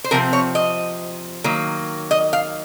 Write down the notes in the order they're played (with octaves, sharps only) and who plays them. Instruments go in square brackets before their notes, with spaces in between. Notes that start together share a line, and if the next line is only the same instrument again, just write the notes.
[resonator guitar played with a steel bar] C5
C3 F3 C4 A#4
C#5
D#5
D#3 F#3 A#3
D#5
F5